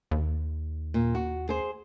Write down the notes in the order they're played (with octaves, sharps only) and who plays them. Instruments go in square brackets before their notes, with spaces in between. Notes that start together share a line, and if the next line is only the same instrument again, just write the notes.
[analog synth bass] D#2
[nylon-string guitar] A#2
F#4
G#4 C5